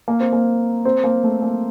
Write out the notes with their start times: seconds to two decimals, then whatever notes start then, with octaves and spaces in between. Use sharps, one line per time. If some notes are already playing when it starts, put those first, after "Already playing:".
0.08 A#3
0.20 C4
0.33 A#3
0.85 C4
1.04 A#3
1.23 A3
1.42 A#3